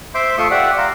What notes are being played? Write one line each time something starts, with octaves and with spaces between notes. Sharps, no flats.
C5 E5 C6 D6 G6
A3 F4 E5 C6 C#6 D#6
G4 D5 E5 F#5
F5 A#5 C6